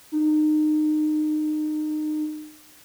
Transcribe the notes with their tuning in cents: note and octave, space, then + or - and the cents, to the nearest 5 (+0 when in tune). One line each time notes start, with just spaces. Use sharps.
D#4 -30